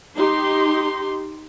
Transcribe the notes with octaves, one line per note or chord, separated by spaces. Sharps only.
D#4 G4 C6